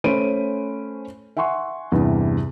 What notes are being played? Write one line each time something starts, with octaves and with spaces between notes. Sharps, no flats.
A3 C#4 C5 B5 D7 D#7
E5 F#5 G#5 C6 C#6
E2 G2 C3